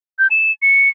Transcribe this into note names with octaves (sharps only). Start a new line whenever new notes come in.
G6
E7
C#7